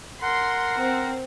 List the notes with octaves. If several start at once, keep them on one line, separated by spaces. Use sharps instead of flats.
A#4 F#5 C6
C4